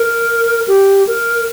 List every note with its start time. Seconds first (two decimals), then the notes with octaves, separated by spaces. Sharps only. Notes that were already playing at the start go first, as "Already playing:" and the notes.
Already playing: A#4
0.68 G4
1.07 A#4